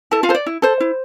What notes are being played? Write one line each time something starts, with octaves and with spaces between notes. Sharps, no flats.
E4 A4 A5
F4 F5
A4 C5
D5
E4
A4 C5
E4